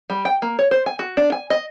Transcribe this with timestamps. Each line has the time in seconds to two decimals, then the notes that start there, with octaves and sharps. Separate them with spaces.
0.10 G3
0.25 G5
0.42 A#3
0.59 C#5
0.71 C5
0.86 G#5
0.99 F#4
1.17 D4
1.32 G#5
1.50 D#5